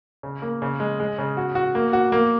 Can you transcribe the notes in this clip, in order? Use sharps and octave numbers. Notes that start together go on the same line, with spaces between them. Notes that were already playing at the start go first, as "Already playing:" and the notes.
C#3
A#3
C#3
G#3
G#3
C#3
F#4
F#4
A#3
F#4
A#3